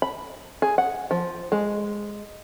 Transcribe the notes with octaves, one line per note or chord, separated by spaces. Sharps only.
B5
G#4
F#5
F3
G#3